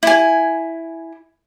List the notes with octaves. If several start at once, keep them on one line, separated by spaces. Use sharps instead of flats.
E4 G#5